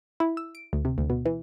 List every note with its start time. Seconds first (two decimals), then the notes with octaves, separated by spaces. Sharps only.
0.20 E4
0.37 E6
0.55 D7
0.73 D2
0.85 C3
0.98 D2
1.10 B2
1.26 E3